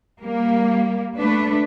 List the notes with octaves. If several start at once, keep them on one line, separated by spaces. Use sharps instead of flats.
G3 A#3
A3 D4 B4